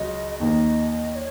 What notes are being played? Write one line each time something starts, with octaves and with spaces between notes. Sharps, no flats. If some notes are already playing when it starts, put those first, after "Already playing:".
Already playing: C#2 C#3 F#3 C#4 D#5
D#2 D#3 A#3 D#5
C#5